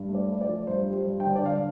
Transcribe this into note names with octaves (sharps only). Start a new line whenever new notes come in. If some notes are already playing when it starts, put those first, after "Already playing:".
Already playing: G2
A3
D5
A3
D5
F3
G2 C5
G3
C5
G2
G5
D3
D5
D3 F5